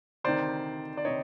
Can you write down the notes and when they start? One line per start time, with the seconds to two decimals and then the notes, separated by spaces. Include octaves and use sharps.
0.24 D2 C3 D#3 C5 D5
0.97 D5
1.05 C3 D#3 C#5 D#5